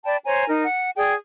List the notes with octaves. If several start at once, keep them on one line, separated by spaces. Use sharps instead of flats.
D5 G5 A5 B5
C5 C#5 G#5 A#5
D#4 A#4
F#5
G#4 D5 G5